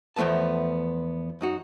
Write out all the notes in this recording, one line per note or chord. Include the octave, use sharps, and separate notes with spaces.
E2 F3 A3 B3 A5
F#2 D#4 F#4